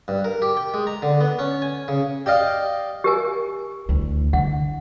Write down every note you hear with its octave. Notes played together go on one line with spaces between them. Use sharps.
G2
A#4
G4
G5
G#3
A#5
D3
B3
C#4
G#5
C#3
G4 D5 D#5 F5
G4 A#4 G#5
D2 E3
D3 E3 F#5